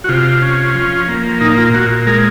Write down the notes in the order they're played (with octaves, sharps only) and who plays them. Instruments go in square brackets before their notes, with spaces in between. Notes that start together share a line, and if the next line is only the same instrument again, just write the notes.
[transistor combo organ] F#4
C3 F4
C#4
F3
A#3
A#2 D#4
F4
A#2 F#4
G#3 A#4